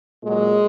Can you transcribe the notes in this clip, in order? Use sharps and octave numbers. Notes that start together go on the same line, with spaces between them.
A#2 F#3 G#3